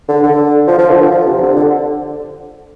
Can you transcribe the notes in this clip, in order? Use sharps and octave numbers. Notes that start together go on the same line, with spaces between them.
D3
D3
F3
F3
D3
F3
F3
C3
D3
D3